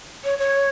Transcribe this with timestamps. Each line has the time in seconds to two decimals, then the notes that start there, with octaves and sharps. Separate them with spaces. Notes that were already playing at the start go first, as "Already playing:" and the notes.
0.24 C#5
0.39 C#5